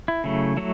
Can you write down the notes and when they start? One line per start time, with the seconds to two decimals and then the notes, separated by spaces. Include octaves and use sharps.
0.08 E4
0.24 C#3 F#3 A3
0.57 F#3 A3